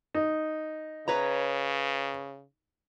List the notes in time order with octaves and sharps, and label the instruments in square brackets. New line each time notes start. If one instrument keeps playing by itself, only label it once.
[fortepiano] D#4
[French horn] C#3 [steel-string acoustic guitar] B4 C#5 A#5